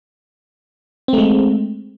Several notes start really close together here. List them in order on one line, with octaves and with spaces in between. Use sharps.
C4 A3 G#3